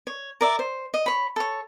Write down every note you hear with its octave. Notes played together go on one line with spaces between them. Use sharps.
C#5
A#4 D5 E5
C5
D#5
C#5 B5
A4 C#5